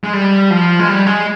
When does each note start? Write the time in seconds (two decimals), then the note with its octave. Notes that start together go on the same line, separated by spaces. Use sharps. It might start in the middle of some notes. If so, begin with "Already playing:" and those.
0.04 G#3
0.13 G3
0.50 F3
0.80 G#3
0.88 G3
1.07 G#3